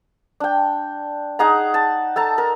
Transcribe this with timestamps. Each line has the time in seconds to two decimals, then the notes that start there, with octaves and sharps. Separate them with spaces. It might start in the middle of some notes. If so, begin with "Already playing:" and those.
0.40 D4 G5
1.39 D#4 G#4 F#5 A#5
1.74 A5
2.16 A4 A5 A#5
2.38 A#4